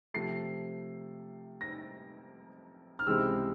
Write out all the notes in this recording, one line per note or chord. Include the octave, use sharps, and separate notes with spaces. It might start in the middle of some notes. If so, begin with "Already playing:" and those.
C3 F3 A3 C7
A#6
F6
C#2 C3 E3 G#3 C4 E6